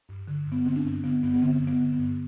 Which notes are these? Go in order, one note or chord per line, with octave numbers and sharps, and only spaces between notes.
G2
D3
G2
B3
D3 C4
D4
G2 C4
D3 B3
G2 B3
B3
D3 C4
G2
B3
D3
B3
G2